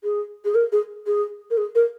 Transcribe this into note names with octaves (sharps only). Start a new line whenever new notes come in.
G#4
G#4
A#4
G#4
G#4
A#4
G#4
A#4